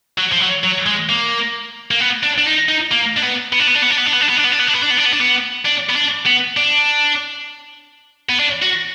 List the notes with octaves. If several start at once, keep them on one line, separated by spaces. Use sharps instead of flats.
F#3
F3
F#3
F#3
G#3
A#3
A#3
B3
D4
D4
D#4
D#4
A#3
D4
B3
B3
D4
B3
D4
B3
D4
B3
D4
B3
D4
B3
D4
B3
D4
B3
D4
B3
D4
B3
D4
B3
D4
B3
D4
B3
D4
B3
D4
B3
D4
F#4